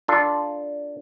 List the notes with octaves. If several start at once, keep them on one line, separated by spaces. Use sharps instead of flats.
D4 F4 A4